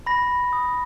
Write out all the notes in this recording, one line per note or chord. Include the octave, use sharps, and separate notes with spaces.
B5 A#6
D#6